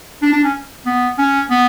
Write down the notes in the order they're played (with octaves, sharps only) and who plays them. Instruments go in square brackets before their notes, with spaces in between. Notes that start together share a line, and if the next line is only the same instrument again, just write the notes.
[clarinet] D4
D4
C#4
B3
C#4
B3